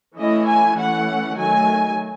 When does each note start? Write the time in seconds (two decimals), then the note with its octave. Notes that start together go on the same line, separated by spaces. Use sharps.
0.17 E3 A3 C#4 E4 D#5
0.46 G#5
0.76 E3 A3 C#4 F#5
1.35 D#3 F#3 A3 G#5